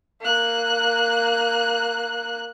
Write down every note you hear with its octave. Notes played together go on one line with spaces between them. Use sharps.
A#3 F#6